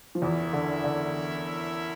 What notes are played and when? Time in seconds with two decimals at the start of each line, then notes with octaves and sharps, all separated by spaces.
0.15 F3
0.22 E2 E3 C#4 E4 A#4 E5
0.53 D3
0.84 D3